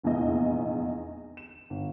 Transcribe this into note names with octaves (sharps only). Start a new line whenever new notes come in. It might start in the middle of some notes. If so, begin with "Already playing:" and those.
F1 A#1 E2 B3 E4 D#5
E7
G1